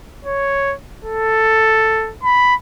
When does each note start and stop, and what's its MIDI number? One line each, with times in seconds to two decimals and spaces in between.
0.25 0.75 73
1.05 2.13 69
2.23 2.55 83